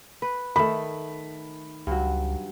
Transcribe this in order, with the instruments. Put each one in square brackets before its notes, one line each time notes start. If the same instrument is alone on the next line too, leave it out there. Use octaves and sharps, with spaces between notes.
[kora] B4
[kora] D#3 A3 [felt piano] B5
[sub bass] C#2 [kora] G2 F#3